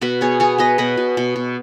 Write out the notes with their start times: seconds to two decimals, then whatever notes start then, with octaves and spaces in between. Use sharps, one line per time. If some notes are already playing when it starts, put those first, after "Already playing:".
0.02 B2 F#4 B4
0.21 B3 G#4 C#5
0.40 B3 G#4 C#5
0.58 B3 B4 D#5
0.78 B2 B4 D#5
0.97 B2
1.17 B2
1.36 B2